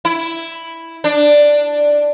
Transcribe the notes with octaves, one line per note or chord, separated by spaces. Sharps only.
E4
D4